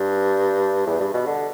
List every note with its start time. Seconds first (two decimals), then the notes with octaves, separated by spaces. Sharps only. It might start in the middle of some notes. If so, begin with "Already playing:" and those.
Already playing: G2
0.86 E2
1.00 G2
1.14 B2
1.27 D3